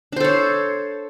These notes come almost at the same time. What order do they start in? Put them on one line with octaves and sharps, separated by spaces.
D4 C5 A4 C#5